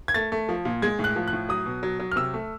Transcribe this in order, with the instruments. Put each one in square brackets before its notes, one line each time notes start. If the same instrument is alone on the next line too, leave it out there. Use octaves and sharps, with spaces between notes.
[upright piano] G#6
A3 A6
A3
F3
A#2
G#3 G#6
A2
F#6
F3
F#6
A2
F#3 D#6
B2
F#3
F#3
F6
C3 E6
A3